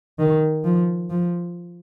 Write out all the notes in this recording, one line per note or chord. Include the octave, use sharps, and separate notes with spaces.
D#3
F3
F3